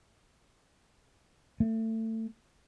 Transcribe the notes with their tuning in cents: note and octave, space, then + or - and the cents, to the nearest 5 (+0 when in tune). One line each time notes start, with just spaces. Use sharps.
A3 +25